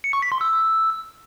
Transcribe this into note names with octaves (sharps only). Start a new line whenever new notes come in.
C#7
C#6
B6
C6
E6